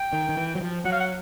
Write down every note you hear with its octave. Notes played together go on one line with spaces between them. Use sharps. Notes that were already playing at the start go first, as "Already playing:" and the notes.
Already playing: G5
D#3
D#3
E3
F#3
F3
F#3 F#5
F5
F#5